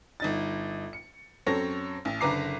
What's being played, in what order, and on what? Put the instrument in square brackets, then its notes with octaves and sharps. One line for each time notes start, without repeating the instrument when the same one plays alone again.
[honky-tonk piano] G1 D#4 A6
C#7
F#2 C4 A4 C#5 A#6
A1
F#1 D3 B4 A#5 D6 C7